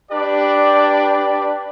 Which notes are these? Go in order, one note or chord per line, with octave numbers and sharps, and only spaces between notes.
D4 G4 B4 D5